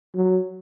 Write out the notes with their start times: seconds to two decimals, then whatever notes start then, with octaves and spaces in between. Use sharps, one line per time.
0.15 F#3